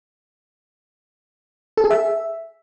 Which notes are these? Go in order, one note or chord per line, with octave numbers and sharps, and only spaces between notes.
A4
G#4
E5